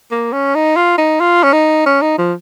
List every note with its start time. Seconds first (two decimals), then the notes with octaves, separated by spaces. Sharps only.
0.11 A#3
0.33 C#4
0.55 D#4
0.76 F4
0.98 D#4
1.20 F4
1.43 C#4
1.53 D#4
1.86 C#4
2.02 D#4
2.18 F3